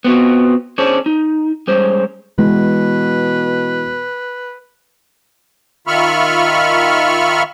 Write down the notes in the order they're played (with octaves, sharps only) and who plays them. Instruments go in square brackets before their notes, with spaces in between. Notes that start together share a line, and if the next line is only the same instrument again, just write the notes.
[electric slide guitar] B3 C4 F4 F#4
C#4 D4 G#4 C5 C#5
D#4
G3 G#3 C#4 C5
[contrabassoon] B2 [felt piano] E3 [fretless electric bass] G#3 [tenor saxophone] B4
[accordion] D#3 F4 E5 B5 C#6 F6